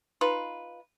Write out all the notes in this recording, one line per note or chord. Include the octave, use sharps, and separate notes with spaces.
D#4 F4 B4